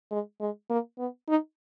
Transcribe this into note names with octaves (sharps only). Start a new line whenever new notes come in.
G#3
G#3
A#3
B3
D#4